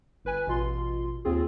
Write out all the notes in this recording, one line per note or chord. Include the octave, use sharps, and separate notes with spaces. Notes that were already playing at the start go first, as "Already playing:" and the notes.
G1 B4 G#5
A1 B2 F4 C6
D#2 C4 F4 G#4